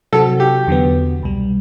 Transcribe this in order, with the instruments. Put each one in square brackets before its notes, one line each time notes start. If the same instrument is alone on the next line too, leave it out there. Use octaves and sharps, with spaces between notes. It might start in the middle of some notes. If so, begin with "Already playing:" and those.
[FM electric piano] C3 F#3 C4 F#4 [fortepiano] A4
[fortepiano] G4
[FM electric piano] E2 D3 F#3 B3
C2 B2 G3